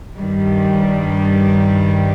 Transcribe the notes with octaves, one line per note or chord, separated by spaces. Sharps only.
G2 D#3 G3